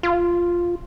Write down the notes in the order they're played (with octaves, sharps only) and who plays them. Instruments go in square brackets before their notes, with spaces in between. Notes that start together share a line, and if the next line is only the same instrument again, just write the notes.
[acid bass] F4